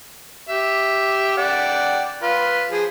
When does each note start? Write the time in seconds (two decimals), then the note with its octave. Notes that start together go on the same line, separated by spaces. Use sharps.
0.49 G4 E5
1.37 D5 F#5 G5
2.22 F4 B4
2.71 F3 G#4